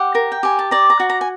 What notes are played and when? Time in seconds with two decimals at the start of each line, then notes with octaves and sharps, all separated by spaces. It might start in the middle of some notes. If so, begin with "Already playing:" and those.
Already playing: G4 F#5
0.15 A#4
0.32 G5
0.43 G4 G#5
0.59 A5
0.71 D5 A#5
0.90 A#5
1.00 F#4
1.10 A#5
1.21 G#5